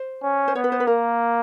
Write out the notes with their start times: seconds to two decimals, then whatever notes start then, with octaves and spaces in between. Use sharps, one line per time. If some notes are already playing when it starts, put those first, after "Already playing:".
Already playing: C5
0.23 C#4
0.48 C5
0.55 B3 C#5
0.64 B4
0.72 C5
0.80 B4
0.87 A#3 A#4